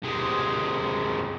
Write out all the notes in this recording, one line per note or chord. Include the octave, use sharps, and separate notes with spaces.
C3 G#3